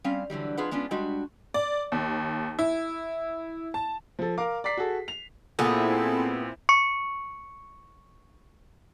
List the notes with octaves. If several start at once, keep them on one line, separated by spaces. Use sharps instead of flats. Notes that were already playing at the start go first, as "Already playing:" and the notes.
G3 C4 C#4 F5
D3 E3 F#3 G3
F2 D4 F4 G#4 B4 F#5
G#3 B3 C#4 D4 F4
G3 G#3 D4 F#4
D5
D#2
E4
A5
F3 A4
A#4 F5 D6
D5 A#5 D6 B6 C7
F#4 G#4 A4
F7
A#2 B3 C4 E4 G#4 A4
C#6 C#7